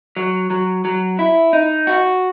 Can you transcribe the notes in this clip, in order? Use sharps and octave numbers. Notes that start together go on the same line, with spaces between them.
F#3
F#3
F#3
E4
D#4
F#4